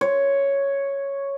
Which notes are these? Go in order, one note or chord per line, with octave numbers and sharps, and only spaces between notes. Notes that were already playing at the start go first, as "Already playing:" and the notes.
C#5